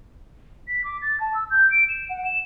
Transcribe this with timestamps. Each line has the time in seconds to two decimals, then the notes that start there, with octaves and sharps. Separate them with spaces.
0.67 B6
0.84 D6
1.01 A6
1.20 A5
1.34 E6
1.50 G6
1.70 D7
1.88 E7
2.09 F#5
2.24 E7